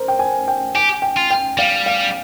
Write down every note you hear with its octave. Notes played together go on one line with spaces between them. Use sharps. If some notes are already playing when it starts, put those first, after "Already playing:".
Already playing: A#4 C5
G5
G#5
G5
G4 G#5
G5
F4
G5
G3 F5
F5